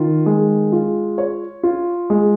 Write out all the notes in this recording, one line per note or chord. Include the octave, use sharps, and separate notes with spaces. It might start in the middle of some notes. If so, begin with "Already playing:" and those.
Already playing: D#3 F4
G#3
F4
C#5
F4
G#3